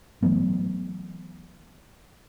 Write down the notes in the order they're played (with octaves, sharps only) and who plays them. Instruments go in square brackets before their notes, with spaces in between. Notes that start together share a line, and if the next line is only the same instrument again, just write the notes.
[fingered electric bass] E3 F#3 A3 B3